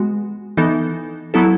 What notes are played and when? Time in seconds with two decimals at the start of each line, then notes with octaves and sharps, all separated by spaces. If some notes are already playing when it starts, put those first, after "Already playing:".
Already playing: G#3 B3 F#4
0.57 E3 B3 D#4 A4
1.34 F#3 B3 E4 A4